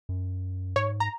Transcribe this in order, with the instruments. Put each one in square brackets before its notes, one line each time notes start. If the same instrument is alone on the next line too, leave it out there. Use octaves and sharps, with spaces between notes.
[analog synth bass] F#2
[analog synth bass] G#2 [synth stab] C#5
[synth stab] A#5